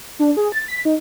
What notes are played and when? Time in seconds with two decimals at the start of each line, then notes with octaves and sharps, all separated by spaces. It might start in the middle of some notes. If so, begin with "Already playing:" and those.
0.19 D4
0.37 G#4
0.52 A6
0.68 B6
0.85 D#4